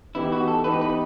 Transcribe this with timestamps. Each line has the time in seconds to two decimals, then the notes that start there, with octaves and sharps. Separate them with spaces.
0.15 E3 B3 D#4 E4 G4
0.32 F#4
0.48 A4
0.64 E3 B3 D#4 G4 B4
0.81 B4